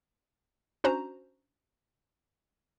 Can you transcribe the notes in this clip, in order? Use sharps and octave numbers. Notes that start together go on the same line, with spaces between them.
C#4 D4 F#4 C5 A#5